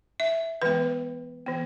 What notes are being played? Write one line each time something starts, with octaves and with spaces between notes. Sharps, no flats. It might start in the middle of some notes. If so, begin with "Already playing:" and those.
E5
E3 G#3 B3 B4
E3 B3